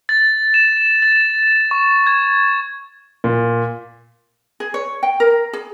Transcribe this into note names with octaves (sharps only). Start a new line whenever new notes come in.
A6
E7
A6
C#6
G#6
A#2
G#4
C#5
G5
A#4
G#4